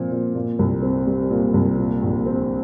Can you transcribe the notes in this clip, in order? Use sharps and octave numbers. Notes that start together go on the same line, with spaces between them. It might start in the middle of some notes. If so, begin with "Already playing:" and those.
Already playing: A#2 F3 C4
A#2
A#2
C2
C4
G3
A#2
C2
A#2
A#1
C4